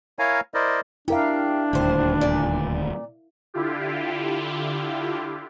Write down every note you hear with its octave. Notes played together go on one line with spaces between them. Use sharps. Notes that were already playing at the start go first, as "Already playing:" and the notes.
E4 A#4 C#5 F5 G#5 A#5
E4 A#4 C5 D5 D#5
D4 E4 G4 A#4 F5
D#1 D2 G3 C5
A#2 D5
D3 E4 F4 G4